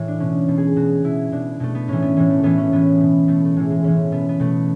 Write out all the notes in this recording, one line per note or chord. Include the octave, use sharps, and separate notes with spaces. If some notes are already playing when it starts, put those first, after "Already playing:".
Already playing: A2 E3 E4
D4
B2 C#4
B2 A3
G#4
B2 F#4
B2 E4
B2 D4
B2 A3
B3
A2 E3 C#4
B3
A2 E3
A3
A2 E3 B3
C#4
A2 E3 B3
B2
B2 A3
A3
A2 E3 G#3
G#3
A2 E3 C#4
B2 B3
B3
B2 A3